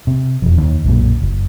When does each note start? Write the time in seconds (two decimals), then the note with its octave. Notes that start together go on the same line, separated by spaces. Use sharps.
0.07 C3
0.42 E1 F2
0.58 D#2 D#3
0.84 B1 F#2 A#2
1.22 F#1